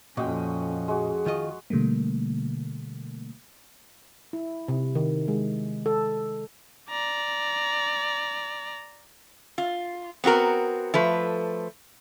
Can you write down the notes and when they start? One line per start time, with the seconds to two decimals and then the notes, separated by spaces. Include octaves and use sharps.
0.17 F2 A#2 C#4 F#4 D#5 G5
0.88 G#3 F#4 G#4
1.26 D#3 F4 D#5
1.70 B2 D3 G3 A3 A#3
4.33 E4
4.68 C3
4.95 D#3
5.28 G#3
5.86 A4
6.90 D5 A#5
9.58 F4
10.24 B3 C4 F#4 A#4
10.94 F3 A3 B4